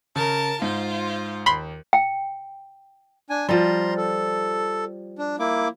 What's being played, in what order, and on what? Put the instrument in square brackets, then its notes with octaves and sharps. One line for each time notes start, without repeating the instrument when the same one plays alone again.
[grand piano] C#3 [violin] A#4 A5
[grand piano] G#2 [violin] F4 C5
[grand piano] D#2 [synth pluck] B5 C6
[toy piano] G5
[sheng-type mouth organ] D4 G#5
[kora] F3 G3 [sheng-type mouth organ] A#5 C6
[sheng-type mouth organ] A4
D4
A#3 E4 D6